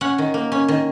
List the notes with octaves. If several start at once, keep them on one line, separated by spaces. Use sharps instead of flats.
C#4 F#5
D#3
A#3
C#4
D#3